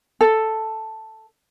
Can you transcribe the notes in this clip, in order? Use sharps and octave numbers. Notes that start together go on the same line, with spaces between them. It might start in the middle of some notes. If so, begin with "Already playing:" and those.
A4